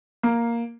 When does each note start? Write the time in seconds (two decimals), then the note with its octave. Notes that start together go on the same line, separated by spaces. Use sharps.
0.23 A#3